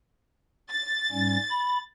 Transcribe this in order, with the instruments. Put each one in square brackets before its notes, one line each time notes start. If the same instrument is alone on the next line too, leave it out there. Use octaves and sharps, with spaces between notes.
[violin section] A6
[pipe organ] G#2 G3 C#4
B5